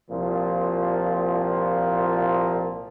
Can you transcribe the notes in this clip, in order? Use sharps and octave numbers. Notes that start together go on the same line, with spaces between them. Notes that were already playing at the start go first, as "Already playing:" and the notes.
C2 A#2 F3